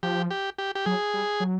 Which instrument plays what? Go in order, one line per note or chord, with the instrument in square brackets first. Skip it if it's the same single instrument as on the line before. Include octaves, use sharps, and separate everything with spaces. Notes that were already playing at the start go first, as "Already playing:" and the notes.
[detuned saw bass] F3 [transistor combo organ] G4
[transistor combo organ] G4
G4
G4
[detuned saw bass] F#3 [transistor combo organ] G#4
[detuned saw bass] G3
F#3